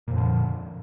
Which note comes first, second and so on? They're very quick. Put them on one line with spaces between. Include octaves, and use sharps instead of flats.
A#2 F2 D3 F3